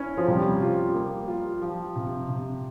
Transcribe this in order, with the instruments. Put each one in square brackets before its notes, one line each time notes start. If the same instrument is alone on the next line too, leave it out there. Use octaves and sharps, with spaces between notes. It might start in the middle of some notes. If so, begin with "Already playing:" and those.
Already playing: [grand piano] C#4 E4
[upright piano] F3
[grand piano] C3 [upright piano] G3
[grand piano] F4
A#3
F4
F3
C3
C3